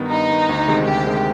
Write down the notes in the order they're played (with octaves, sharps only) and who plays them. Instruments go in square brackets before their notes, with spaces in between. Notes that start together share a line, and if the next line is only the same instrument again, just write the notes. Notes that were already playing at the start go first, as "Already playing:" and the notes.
Already playing: [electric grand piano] G2 D#3 B3
[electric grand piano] G2 [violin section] D#4
[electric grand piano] D#3 B3
D2
C3 D#3 G#3
[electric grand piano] D2 [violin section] G4
[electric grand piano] C3 D#3 G#3